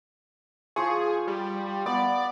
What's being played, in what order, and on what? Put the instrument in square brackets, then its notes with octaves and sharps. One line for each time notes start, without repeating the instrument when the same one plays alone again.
[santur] F3 C#6 [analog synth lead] G#4
[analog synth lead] G3
[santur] B3 [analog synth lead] D5